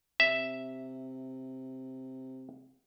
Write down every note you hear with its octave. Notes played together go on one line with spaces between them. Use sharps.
C3 E5